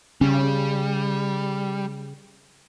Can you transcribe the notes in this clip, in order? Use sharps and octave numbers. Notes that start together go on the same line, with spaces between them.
C#3 G3 C#4